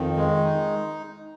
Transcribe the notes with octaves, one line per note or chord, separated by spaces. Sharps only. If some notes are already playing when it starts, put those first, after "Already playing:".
Already playing: F2 D#3
G#3
D#4